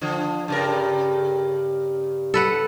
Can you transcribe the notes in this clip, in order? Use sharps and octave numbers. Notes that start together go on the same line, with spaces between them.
D3 F3
G2 C#3 A#4
A4 B4 F#5